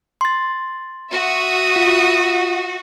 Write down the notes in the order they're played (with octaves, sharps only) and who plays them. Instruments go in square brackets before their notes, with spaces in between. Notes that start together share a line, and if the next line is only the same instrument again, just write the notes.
[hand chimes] C6 A6
[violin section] F#4 [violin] E5 D#6
[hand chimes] F4